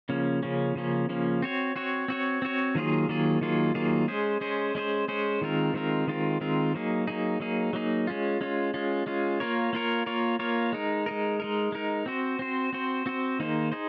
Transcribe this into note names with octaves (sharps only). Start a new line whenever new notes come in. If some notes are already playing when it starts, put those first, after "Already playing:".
C#3 F3 A#3 C#4
C#3 F3 A#3 C#4
C#3 F3 A#3 C#4
C#3 F3 A#3 C#4
C4 F#4 C#5
C4 F#4 C#5
C4 F#4 C#5
C4 F#4 C#5
D#3 F#3 A#3 F4 G#4
D#3 F#3 A#3 F4 G#4
D#3 F#3 A#3 F4 G#4
D#3 F#3 A#3 F4 G#4
G#3 C#4 G#4 C5
G#3 C#4 G#4 C5
G#3 C#4 G#4 C5
G#3 C#4 G#4 C5
D#3 G#3 C4 F4 A#4
D#3 G#3 C4 F4 A#4
D#3 G#3 C4 F4 A#4
D#3 G#3 C4 F4 A#4
F#3 A#3 D#4 G#4
F#3 A#3 D#4 G#4
F#3 A#3 D#4 G#4
F#3 A#3 D#4 G#4
G#3 C#4 F4
G#3 C#4 F4
G#3 C#4 F4
G#3 C#4 F4
A#3 F4 A#4 C#5
A#3 F4 A#4 C#5
A#3 F4 A#4 C#5
A#3 F4 A#4 C#5
G#3 D#4 A#4
G#3 D#4 A#4
G#3 D#4 A#4
G#3 D#4 A#4
C4 F#4 C5
C4 F#4 C5
C4 F#4 C5
C4 F#4 C5
D#3 A#3 D#4 G#4 C5
D#4 G#4 C5